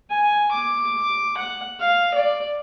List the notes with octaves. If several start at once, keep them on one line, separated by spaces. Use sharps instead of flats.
G#5
D6
F#5
F5
D5